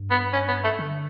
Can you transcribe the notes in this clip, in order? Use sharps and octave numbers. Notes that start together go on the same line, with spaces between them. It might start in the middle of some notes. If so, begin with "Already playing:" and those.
Already playing: G2
B3
C#4
B3
A3
D3